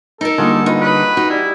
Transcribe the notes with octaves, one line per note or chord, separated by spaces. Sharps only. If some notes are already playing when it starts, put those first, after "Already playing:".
D#4 A4 A#4
D3 G3 A#3 F4 F#4 G#4
D#4 F4 B4
F#4 B4 C#5 D#5
D#4 F#4
G3 E4